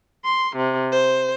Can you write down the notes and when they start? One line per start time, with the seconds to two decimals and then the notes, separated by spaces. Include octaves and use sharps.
0.25 C6
0.55 C3
0.93 C5